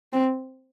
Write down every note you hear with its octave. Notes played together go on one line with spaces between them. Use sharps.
C4